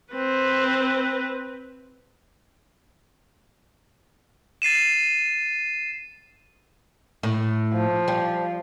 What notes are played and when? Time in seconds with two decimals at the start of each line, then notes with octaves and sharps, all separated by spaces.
0.14 C4 B4
4.62 A6 C7 D#7 E7
7.23 A2
7.73 F3
8.08 G3